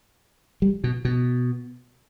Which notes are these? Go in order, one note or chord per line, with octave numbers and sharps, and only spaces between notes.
G3
B2
B2